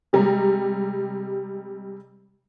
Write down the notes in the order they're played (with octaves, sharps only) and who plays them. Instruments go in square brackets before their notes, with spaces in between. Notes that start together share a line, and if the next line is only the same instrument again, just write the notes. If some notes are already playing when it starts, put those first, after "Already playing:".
[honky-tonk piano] C3 G3 G#3 A#5